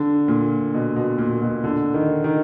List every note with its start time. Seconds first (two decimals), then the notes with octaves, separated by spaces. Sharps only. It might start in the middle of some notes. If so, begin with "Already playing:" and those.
Already playing: D3
0.28 A#2
0.74 B2
0.96 B2
1.18 A#2
1.42 B2
1.64 D3
1.94 D#3
2.24 D#3